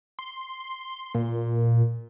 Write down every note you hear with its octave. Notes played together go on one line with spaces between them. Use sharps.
C6
A#2